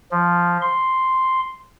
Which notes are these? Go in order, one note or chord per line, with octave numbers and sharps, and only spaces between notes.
F3
C6